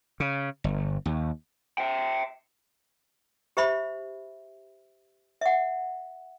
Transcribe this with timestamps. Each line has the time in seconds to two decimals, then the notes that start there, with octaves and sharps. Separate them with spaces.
0.20 C#3
0.64 G1
1.06 D#2
1.78 E5 G5
3.57 G4 C5 E5 B5
5.41 E5 F#5